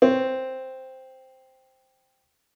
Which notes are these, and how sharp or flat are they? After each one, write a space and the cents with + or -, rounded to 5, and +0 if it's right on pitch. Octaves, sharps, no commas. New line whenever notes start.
C4 +0 C#5 +0